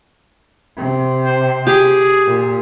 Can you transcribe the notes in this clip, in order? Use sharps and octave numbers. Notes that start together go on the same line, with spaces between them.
C3
C5
G4 G#4
A#2